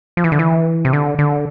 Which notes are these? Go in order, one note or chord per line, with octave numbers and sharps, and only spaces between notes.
F3
E3
D3
E3
C3
D3
D3